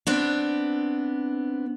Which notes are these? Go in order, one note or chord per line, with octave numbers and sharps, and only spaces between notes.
B3 C4 D4